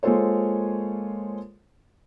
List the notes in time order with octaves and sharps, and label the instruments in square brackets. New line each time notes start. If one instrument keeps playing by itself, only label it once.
[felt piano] G#3 A#3 F4 A4 C5 C#5